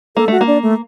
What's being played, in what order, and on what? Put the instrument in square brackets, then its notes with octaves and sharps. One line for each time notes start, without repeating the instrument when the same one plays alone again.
[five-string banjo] A#3 [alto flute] A4
[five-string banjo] A3 [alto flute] F#4
[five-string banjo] A#3
[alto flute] D4
A3